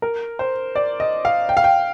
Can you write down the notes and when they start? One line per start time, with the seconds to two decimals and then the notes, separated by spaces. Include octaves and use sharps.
0.02 A#4
0.39 C5
0.76 D5
1.00 D#5
1.25 F5
1.49 G5
1.57 F5
1.64 G5